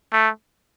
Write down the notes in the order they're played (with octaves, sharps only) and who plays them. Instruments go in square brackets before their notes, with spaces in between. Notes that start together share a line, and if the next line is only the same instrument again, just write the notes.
[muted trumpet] A3